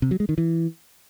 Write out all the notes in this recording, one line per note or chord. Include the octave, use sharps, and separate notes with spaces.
C3
F#3
G#3
D#3
E3